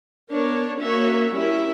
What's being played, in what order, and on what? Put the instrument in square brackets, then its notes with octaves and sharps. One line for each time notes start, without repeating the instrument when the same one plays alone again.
[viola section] B3 D4 A#4 C#5
A#3 C#4 F#4 C#5 E5
G3 C#4 E4 A#4 E5